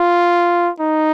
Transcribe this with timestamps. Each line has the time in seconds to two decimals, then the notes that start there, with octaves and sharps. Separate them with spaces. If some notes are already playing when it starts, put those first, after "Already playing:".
Already playing: F4
0.80 D#4